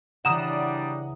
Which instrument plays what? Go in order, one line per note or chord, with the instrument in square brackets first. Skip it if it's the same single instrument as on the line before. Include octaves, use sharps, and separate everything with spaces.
[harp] C#3 E3 [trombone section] G3 D4 [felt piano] F#5 A#5 D#6 [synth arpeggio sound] E7